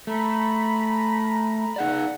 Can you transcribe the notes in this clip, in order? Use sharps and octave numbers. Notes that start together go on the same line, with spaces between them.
A3 A#5 B5
D#4 G#4 D5 F#5